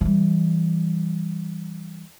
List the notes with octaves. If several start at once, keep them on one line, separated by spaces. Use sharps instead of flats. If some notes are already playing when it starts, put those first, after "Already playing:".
E3 G3